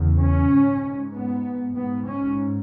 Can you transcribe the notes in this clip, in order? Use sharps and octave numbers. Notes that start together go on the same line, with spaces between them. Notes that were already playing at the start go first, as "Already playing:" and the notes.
Already playing: E2 C#3
C#4
G#2
B3
G#2 B3
C#4